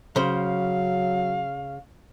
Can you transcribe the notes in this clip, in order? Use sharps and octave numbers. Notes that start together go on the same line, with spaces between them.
C#3 F#3 C5 F5